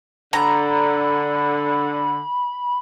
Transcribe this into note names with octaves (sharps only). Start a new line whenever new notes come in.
D3 A#5 B5